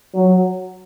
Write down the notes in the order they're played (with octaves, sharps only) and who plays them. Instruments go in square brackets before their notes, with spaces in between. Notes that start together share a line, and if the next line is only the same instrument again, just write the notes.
[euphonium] F#3